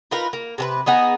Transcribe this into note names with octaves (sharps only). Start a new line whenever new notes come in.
D#4 F4 A#4 B4
A#3
C3 A4 B4
B3 D#4 G#4